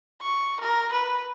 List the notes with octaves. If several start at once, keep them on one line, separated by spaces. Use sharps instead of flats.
C#6
A#4
B4